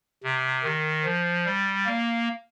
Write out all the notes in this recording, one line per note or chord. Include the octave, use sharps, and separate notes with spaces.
C3
D#3
F3
G3
A#3